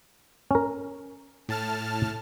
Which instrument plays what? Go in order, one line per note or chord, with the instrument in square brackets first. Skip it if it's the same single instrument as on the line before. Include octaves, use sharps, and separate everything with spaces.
[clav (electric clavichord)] C#4 A#4
[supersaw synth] A2 A5 F6